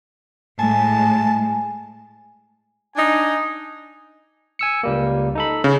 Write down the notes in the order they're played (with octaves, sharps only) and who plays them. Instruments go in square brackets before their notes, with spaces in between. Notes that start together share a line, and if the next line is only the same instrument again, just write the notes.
[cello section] A2 G#3 [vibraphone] G#5 [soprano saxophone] A5
[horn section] D4 D#4 G#5
[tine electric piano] G#5 E6 C#7
C#2 G3 A#3
D#4 A4 B5
[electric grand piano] C#3